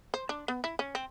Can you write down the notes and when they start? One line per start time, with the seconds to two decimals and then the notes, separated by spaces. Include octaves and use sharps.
0.14 C5
0.29 D4
0.48 B3
0.64 E4
0.79 C#4
0.95 C4